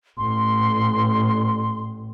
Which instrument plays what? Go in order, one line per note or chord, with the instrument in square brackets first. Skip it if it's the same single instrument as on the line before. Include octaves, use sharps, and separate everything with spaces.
[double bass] A1 [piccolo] C6